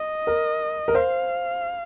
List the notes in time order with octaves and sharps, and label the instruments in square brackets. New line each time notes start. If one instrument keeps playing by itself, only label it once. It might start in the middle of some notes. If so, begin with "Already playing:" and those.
Already playing: [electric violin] D#5
[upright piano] A#4
A#4
[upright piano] C5 [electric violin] F5